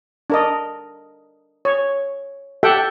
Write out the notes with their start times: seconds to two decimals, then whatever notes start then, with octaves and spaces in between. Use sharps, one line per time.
0.30 D4 A#4 D#5
1.65 C#5
2.63 G4 A4 E5 F#5 G5